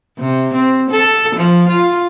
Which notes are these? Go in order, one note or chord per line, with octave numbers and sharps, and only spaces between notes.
C3
C4
A4
F3
F4